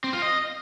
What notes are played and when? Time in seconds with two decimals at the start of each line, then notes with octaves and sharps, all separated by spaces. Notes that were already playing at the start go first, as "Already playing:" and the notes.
0.04 C4
0.13 F4
0.22 D#5